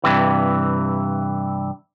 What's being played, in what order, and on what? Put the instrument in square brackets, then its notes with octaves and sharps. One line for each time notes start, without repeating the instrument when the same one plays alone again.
[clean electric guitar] G2 C3 E3